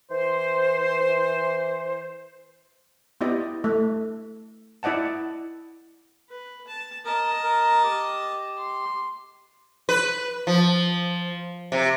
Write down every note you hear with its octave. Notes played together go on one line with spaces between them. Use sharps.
E3 C5
B3 E4 G4 D5 D#5
A3
E4 D5 D#5 F#5 A5
B4
A5
A#4 D#5 A5
A#4
G4
C6
B4
F3
C3